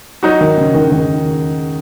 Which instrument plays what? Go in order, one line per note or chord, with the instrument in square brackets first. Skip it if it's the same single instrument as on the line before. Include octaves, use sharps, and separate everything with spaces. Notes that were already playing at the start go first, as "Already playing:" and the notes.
[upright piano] F#3 D#4 F#4
[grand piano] D#3
C#3
D#3
D#3